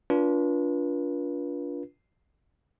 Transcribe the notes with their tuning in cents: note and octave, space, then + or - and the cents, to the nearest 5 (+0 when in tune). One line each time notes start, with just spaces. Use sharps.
D4 -30 F4 +0 B4 -35